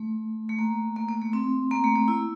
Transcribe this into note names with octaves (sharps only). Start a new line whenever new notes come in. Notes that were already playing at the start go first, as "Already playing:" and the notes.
Already playing: A3
A3
A#3
A#3
A#3
A3
C4
A#3
A3
A#3
E4